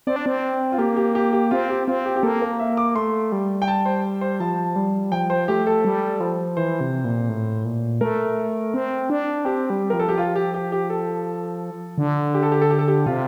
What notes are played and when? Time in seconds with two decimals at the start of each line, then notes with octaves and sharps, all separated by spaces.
0.07 C4 D5
0.16 D4
0.26 C4
0.72 F4
0.78 A#3 G4
0.96 G4
1.15 G4
1.33 G4
1.51 C4 F4
1.70 G4
1.87 C4 F4
2.05 G4
2.16 G4
2.23 A#3 A4
2.42 A#4
2.59 E5
2.77 D6
2.95 A3 C6
3.32 G3
3.62 G5
3.67 A5
3.86 C5
4.21 C5
4.40 F3 A5
4.76 G3
5.12 F3 G5
5.30 C5
5.48 A3 G4
5.67 A4
5.85 G3
6.20 F3
6.57 E3 C5
6.81 C3
7.05 A#2
7.29 A2
7.65 A#2
8.01 A3 A#4
8.74 C4
9.10 D4
9.45 C4 G4
9.70 G3
9.90 F3 A#4
9.99 A4
10.09 G4
10.18 F4
10.35 G4
10.54 G4
10.72 G4
10.90 A4
11.98 D3
12.34 G4
12.43 A4
12.52 G4
12.61 A4
12.70 G4
12.79 A4
12.88 G4
13.06 C3 F4